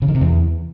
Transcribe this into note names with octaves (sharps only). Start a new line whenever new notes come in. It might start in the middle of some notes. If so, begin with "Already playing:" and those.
C#3
D#3
C3
E2